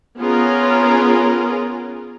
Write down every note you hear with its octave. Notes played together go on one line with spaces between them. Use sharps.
B3 C#4 F4 G#4 A#4